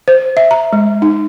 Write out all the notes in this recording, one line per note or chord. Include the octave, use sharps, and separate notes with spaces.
C5
E5
A#5
G#3
D#4